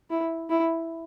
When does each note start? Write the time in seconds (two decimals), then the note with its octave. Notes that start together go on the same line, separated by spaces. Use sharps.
0.10 E4
0.50 E4